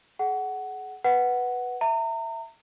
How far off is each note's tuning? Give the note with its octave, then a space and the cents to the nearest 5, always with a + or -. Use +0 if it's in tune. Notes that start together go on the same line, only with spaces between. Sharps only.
G#4 +35 F#5 +10
B4 +0 F#5 +0
E5 +0 A#5 -35